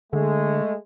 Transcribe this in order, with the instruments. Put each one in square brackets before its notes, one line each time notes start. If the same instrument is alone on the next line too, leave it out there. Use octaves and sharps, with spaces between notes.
[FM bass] D3 [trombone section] G#3 A3